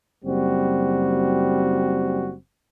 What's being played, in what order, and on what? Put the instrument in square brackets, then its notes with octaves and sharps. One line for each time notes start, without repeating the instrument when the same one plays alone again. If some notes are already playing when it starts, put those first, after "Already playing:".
[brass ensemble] F#1 G3 C4 F#4